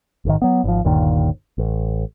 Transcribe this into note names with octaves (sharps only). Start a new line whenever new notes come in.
A1 G#2 D#3
F#3 B3
G#1 F3
G1 D#2 A#2 D#3
A1